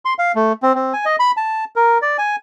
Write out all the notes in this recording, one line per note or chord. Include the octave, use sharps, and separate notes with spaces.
C6
F5
A3
C4
C4
G#5
D#5
B5
A5
A#4
D5
G#5